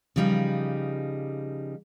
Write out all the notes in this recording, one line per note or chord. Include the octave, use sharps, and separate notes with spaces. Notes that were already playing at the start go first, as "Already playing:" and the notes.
C#3 F3 G3 D#4 B4